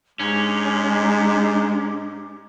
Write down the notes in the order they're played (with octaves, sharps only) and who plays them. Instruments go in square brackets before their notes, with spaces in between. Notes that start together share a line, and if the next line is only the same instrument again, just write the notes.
[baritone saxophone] G#2 [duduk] G#3 [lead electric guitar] C#4 [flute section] D4 G4 D6